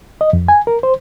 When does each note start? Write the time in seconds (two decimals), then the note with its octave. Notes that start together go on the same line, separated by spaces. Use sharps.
0.21 D#5
0.33 F2
0.48 G#5
0.67 A#4
0.83 C5